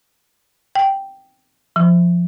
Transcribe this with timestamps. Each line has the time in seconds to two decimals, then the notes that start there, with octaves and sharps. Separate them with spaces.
0.75 G5
1.76 F3